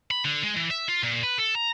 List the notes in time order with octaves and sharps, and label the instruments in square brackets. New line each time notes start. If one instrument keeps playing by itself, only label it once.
[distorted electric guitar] B5
D3
G#3
E3
E5
F4
A#2
B4
A4
A#5